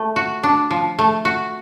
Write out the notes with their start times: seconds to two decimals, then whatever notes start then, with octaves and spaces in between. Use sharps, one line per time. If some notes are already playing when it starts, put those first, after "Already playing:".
Already playing: A3
0.16 F#4
0.43 D4
0.71 F3
0.99 A3
1.25 F#4